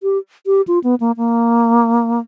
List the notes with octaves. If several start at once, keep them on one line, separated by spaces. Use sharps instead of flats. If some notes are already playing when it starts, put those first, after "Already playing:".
G4
G4
F4
B3
A#3
A#3